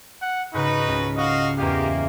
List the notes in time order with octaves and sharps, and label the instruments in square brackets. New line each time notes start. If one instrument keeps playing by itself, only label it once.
[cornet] F#5
[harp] G#2 C#3 [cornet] D#4 [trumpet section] F#4 B4
[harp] C#2
[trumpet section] F#4 F5 [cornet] D#5
[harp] E2 D#5 F5 [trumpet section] A#3 [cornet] G4